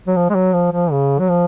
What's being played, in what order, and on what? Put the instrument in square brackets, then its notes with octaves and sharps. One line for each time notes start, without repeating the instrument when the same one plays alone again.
[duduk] F#3
F3
G#3
F#3
F3
F3
C#3
F#3
F3